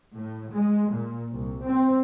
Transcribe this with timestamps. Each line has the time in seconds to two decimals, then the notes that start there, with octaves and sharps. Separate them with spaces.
0.15 A2
0.52 G#3
0.91 A#2
1.31 C2
1.65 C4